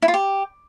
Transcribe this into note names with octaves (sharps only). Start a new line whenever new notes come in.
E4
F4
G4